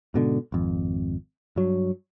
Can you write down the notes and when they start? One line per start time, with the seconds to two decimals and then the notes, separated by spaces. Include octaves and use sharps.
0.14 G#2 B2 D3
0.52 G#1 F2
1.56 G2 F#3